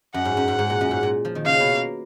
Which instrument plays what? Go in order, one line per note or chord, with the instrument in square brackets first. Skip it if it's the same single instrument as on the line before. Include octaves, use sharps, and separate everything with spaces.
[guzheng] F#2 [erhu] F#5
[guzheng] G#2
F#2
G#2
G#2
A#2
F#2
G#2
A#2
F3
D#3
[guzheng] C#3 [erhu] F5
[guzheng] B2
A#3